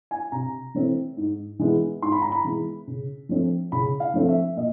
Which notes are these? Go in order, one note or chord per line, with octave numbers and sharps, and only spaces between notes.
G#5
C3 A#5
E3 A3 C4
G#2
E3 G#3 B3
G#2 C6
B5
A#5
B5
E3 G#3 B3
C#3
F3 A3 C4
C#3 B5
F5
F3 A3 C4
E5
A#2 D#5